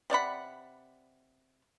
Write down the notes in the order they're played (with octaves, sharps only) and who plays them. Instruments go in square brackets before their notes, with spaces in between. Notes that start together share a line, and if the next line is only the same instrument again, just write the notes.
[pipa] C3 D5 F#5 B5